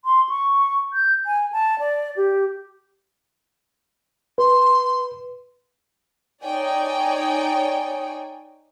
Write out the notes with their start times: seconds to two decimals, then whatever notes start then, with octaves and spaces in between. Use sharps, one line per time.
0.05 C6
0.29 C#6
0.93 G6
1.26 G#5
1.52 A5
1.79 D5
2.16 G4
4.38 B4 C6
6.43 D#4 C#5 D5 G5 G#5